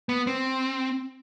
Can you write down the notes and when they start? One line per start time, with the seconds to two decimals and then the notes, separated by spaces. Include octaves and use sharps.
0.09 B3
0.27 C4